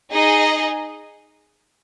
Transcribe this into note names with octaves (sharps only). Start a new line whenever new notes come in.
D#4 G#4 D#5